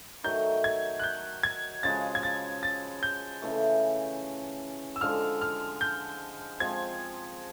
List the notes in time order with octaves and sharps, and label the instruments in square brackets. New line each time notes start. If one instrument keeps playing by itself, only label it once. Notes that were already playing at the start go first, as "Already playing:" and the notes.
[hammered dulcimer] D#3 F#3 A3 [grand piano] G6
[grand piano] G#6
F#6
G6
G#6
[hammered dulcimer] C#3 F3 G#3 [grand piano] A6
[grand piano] G#6
A6
A6
G6
[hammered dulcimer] C#3 E3 A3
[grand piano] E6
[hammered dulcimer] D3 F3 G#3 [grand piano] F6
[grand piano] F6
G6
[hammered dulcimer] F3 G#3 C4 [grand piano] G#6